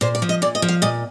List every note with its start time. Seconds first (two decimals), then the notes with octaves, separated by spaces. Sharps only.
0.01 A#2 C5
0.15 D5
0.22 F3
0.29 D#5
0.42 A#2 D5
0.55 D#5
0.62 F3
0.68 F5
0.82 A#2 D#5